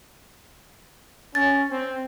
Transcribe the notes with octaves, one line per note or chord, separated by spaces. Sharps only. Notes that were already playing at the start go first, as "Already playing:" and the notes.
C#4 A6
C4